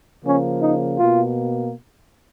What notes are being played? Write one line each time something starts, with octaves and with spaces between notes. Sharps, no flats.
C#3 F3 A#3 C#4
D#4
B2 A#3 F4